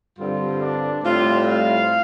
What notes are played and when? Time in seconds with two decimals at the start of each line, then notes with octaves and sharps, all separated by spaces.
0.18 G2 D3 G3 C4 F4
0.61 D4
1.04 A2 G3 C4 F4
1.48 F5